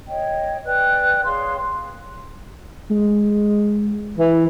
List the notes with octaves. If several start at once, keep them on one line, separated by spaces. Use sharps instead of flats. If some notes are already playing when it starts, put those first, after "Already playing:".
C#5 D#5 G5
B4 D5 G5 F#6
G#4 C#5 F5 C6
G#3
E3